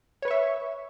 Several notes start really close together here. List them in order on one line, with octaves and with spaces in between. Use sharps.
C#5 B4 C#6 E5